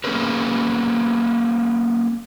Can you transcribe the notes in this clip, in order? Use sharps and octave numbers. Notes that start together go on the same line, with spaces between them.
A#3 C4 C#4 G#4 A#4 B4